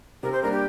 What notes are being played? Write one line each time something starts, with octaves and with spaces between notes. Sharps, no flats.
C3 A#4
C5
G3 A#3 D4 A#4
G4